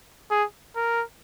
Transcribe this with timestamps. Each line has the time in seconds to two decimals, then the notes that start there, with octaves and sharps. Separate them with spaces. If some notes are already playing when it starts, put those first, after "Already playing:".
0.31 G#4
0.76 A#4